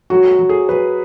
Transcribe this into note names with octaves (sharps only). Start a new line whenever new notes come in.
F#3 F#4
F#3
G#4
F#3 B4